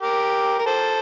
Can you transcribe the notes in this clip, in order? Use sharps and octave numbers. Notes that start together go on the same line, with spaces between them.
G4 A#4
A#4
A4 C5